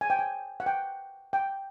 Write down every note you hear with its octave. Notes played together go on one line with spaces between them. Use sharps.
G#5
G5
G#5
F#5
G5
G5